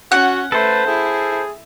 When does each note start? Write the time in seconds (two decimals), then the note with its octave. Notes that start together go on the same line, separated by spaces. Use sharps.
0.12 C#4 F#4 F#5
0.52 A3 A4 B4 C5
0.88 E4 G#4